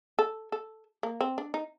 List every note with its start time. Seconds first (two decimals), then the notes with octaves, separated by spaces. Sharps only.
0.19 A4
0.52 A4
1.03 A#3
1.21 C4
1.38 D4
1.54 D#4